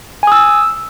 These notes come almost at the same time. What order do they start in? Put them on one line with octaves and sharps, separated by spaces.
G#5 D#6 E6